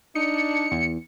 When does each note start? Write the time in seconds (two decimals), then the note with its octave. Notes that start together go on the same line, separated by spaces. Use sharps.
0.15 D4 D#4 C#7
0.72 E2